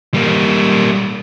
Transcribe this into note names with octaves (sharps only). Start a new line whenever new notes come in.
G3 A#3